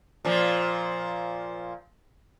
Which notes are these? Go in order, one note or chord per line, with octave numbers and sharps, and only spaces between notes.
A#2 F3